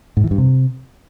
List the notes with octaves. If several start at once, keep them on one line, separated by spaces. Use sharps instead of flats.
G#2
E3
G2
C3